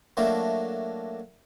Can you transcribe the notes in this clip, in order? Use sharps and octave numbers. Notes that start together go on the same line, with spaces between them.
F#3 A3 A#3 D4 E4